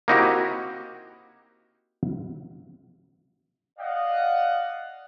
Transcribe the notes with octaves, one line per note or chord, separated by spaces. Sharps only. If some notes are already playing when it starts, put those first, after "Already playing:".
A#3 C4 D#4 E4 F#4 G4
D5 D#5 F5 F#5